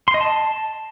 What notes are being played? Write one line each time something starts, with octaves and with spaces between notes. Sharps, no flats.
C6
D#5
A5